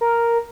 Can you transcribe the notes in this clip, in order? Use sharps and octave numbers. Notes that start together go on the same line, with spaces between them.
A#4